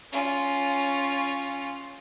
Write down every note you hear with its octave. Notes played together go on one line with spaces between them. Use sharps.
C#4 F4